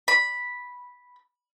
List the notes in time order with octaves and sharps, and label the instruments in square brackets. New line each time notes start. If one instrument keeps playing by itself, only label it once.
[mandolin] B5